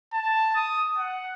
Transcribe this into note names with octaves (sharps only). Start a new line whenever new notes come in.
A5
D#6
F#5